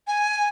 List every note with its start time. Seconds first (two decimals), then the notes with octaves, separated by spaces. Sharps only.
0.07 G#5